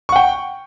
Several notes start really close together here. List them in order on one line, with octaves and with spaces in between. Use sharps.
C#6 F#5 G5